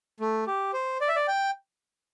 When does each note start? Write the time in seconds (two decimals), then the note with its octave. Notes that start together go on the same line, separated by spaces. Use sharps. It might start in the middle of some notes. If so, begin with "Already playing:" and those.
0.20 A3
0.47 G4
0.73 C5
1.01 D5
1.08 E5
1.16 D5
1.28 G5